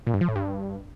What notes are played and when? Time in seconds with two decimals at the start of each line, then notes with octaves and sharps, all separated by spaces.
0.07 A#2
0.14 G2
0.21 F3
0.28 A2
0.36 G2